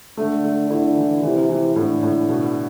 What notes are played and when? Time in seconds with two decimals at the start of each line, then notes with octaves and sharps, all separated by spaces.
0.17 D3 A3
0.44 A3
0.70 D3 E4
0.97 E3
1.23 C3 E3
1.49 E3
1.76 A2 D3
2.03 A2
2.29 B2